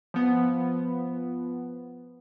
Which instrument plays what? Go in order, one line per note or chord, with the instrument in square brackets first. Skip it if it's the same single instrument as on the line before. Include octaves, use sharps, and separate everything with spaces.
[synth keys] F3 B3